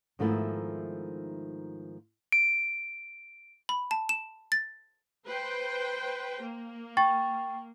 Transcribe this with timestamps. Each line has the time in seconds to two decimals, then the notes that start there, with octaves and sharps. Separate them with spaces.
0.19 G#2 D#3 F3 A3 B3 E4
2.32 D7
3.69 B5
3.91 A5
4.09 E7
4.52 A6
5.26 B4 C5 G5
6.41 A#3
6.97 G5 C#6 A6